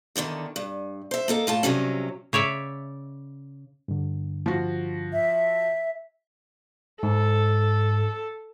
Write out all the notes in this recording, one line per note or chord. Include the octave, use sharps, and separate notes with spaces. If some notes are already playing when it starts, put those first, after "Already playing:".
E2 B2 D3 D#3
G2
C5 E5
A#3 D#4 A4
A2 F4 A5
G2 C3 F#3 C#4
C#3 C#5 D5 E5
G2 D3
F3 F#4
E5
G#2 A4